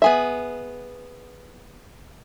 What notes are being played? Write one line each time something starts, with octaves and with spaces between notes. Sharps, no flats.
B3 G#4 E5